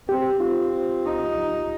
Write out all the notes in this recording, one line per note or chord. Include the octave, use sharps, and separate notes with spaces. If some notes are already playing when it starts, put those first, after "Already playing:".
C4 G4
C4 F4
D#4